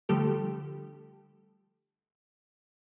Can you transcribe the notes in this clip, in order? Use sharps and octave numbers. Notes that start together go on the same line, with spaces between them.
D3 F3 G3 A3 G4 A4